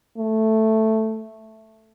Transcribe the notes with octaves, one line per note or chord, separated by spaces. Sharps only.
A3